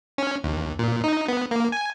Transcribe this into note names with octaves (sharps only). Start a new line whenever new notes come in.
C#4
D#2
A#2
D#4
B3
A#3
G#5